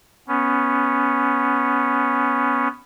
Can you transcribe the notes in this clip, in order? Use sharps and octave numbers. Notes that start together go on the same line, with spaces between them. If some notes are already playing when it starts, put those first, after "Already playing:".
B3 C#4